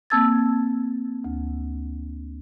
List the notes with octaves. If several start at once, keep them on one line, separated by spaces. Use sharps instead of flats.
A#3 C4 A5 E6 G#6 A6
D2